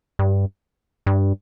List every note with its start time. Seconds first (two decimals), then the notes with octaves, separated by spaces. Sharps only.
0.19 G2
1.07 G2